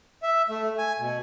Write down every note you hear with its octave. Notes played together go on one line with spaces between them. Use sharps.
E5
A3
G#5
B2